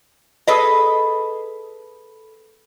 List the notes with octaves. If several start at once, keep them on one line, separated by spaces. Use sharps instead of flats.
G#4 A4 B4 D#5